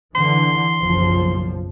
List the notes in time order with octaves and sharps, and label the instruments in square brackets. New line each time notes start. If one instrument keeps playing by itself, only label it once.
[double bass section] D3 E3 [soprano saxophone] C6
[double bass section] F#1 B1 F3